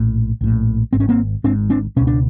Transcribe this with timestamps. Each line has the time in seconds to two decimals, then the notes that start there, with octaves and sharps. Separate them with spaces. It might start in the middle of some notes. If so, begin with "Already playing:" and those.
Already playing: A#1 A2
0.41 A#1 A2
0.93 G#1 G#2 C4
1.00 C#4
1.09 A#3 C4
1.44 G#1 G#2 C4 D4
1.70 C4 D4
1.96 C#2 B2 C#4
2.07 D4